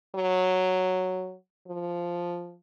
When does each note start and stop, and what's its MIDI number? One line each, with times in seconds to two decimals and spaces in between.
0.16 1.35 54
1.67 2.56 53